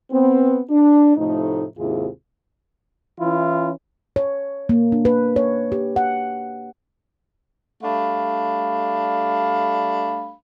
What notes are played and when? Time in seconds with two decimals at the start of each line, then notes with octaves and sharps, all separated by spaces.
0.11 B3 C4
0.70 D4
1.17 A2 C3 F3 A3 D#4
1.78 D#2 G#2 C3 E4 F4 G#4
3.20 E3 C#4 E4 F4
4.16 C#5
4.69 A#3
4.92 D4
5.05 B4
5.36 C#5
5.72 G4
5.96 F#5
7.83 G3 A3 D4 F5 B5